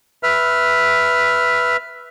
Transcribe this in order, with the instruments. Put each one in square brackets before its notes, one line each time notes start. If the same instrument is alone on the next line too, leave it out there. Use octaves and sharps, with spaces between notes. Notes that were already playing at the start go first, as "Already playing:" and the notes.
[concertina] B4 E5 F6